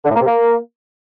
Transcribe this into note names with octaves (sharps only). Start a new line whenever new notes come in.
D3
A2
A#3
C3
A#3